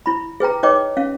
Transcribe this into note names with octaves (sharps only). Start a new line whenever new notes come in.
E4 B5
G#4 B4 G5 A#5
D#4 B4 C#5 D#5 G5 D6
C#4 F5